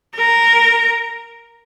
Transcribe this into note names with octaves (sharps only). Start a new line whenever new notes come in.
A#4